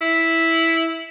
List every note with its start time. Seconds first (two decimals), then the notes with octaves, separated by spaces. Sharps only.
0.01 E4